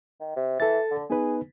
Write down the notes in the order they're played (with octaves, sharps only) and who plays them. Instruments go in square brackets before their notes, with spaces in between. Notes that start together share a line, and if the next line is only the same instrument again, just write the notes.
[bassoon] D#3
C3
[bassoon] E3 [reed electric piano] A4 A6
[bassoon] D3
[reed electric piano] B3 D#4 B4 [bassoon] G#4